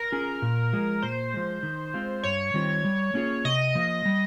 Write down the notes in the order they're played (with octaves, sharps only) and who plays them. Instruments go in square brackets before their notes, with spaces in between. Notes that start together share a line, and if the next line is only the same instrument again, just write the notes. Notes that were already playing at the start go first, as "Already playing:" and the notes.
Already playing: [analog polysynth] A#4
[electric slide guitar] C#4 F4 G#4
A#2
F3 G#3
[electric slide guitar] A#2 [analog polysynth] C5
[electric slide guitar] F3 G#3
D#3
G#3 C4 F4
[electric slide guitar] G2 [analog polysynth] C#5
[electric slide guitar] D#3 G3 C4 F4
G3
A#3 C#4 F4 G#4
[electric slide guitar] C3 [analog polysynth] D#5
[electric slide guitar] F3 A#3
G3